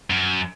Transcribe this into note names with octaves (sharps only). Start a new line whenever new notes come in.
F#2